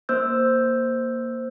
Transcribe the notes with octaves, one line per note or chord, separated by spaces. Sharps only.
A#3 C5 E6 G6